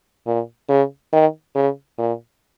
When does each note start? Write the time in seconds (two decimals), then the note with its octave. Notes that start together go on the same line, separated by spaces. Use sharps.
0.27 A#2
0.69 C#3
1.13 D#3
1.55 C#3
1.98 A#2